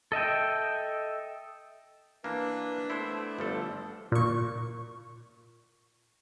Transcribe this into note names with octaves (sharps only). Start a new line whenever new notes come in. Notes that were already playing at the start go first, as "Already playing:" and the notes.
A4 D#5 E5 G5
E3 A#3 D4 B4
A3 B3 D4 E4 C5
G1 F3 A4
A#2 C#6